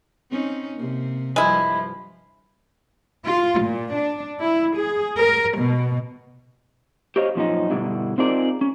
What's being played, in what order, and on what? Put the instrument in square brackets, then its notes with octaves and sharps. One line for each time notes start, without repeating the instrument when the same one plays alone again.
[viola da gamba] C4 C#4 D#4
C3 A#3
[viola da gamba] G2 F3 [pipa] G#3 E4
[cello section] F4
A#2
D4
E4
G#4
A#4
B2
[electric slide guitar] G4 C5 C#5 D#5 F5
F#2 A#2 F3 C4 C#4 D#4
G2 B2 D3 G3 E4
C4 D#4 F4 G#4 A#4 D5
C#4